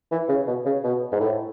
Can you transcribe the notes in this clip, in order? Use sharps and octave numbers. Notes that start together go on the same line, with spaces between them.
E3
C#3
B2
C#3
B2
G#2
A2